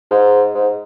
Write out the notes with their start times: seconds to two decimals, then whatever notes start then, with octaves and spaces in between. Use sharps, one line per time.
0.11 G#2
0.55 G#2